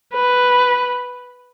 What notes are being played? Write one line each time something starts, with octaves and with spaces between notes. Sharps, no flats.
B4